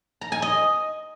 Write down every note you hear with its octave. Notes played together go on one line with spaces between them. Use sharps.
A#5
G#5
D#5